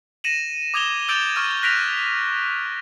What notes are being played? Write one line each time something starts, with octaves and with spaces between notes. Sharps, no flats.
A#6 C#7 D#7 E7 F#7
D6 D#6 G#6 E7 F7 G7
D6 E6 G6 A6 D7 F#7
C#6 E6 F6 G#6
F#6 A#6 B6 D7 F7